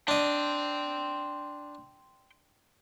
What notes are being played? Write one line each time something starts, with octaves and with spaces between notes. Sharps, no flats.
D4 D#5 G5 C6